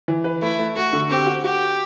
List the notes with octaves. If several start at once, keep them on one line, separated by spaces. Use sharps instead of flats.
E3
B4
A3 E4
A3
A3 F#4
D3
C4 G4
F#4
F#4 G4